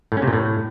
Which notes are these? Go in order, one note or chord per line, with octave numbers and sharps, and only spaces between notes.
A2
C#4
C3
A#2
A2